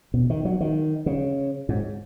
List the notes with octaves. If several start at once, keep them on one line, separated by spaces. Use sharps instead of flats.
B2
D#3
F#3
D#3
C#3
G#2